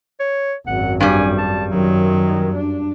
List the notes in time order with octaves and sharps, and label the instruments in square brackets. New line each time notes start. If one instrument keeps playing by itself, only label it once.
[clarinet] C#5
[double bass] G#1 F#2 [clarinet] F#5
[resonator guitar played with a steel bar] G2 G3 [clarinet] G#5
[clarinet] A5
[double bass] F#2 D#3 [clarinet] F#3
[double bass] D4